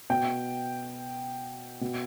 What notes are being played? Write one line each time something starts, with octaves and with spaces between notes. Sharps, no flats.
B2 G5
B2